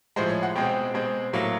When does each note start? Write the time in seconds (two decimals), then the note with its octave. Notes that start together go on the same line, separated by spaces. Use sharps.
0.16 A2 F3 G#3 C5
0.29 C#5
0.43 F#5
0.56 B2 G#3 C4 G5
0.94 B2 G#3 C4
1.33 A2 F#3 A#3